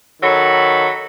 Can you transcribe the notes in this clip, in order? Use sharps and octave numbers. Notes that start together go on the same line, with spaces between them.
D#3 F#3 A4 B5